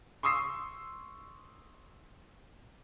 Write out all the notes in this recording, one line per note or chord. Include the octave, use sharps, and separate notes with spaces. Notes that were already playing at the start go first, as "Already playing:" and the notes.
C6 C#6 D#6 E6 C7